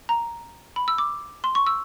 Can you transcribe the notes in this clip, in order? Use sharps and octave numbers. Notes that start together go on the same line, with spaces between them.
A#5
B5
E6
D6
C6
C#6
E6